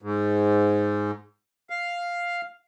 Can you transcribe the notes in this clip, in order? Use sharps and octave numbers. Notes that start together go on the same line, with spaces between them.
G#2
F5